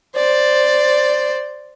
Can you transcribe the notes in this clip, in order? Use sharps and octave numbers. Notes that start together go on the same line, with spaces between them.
C5 D5